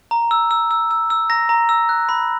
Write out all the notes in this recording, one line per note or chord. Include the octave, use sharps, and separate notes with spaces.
A#5
E6
E6
E6
E6
E6
A#5 A#6
A#5
E6
F#6
B5